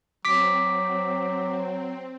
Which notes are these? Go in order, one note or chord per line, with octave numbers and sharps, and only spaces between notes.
F#3 C4 D6 B6